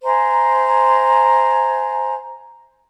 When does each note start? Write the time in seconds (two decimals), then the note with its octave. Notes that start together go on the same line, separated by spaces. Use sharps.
0.04 C5 E5 G#5 A#5